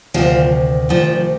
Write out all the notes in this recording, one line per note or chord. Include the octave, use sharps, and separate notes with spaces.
D2 C3 D#3 F3
D2 C3 D#3 F3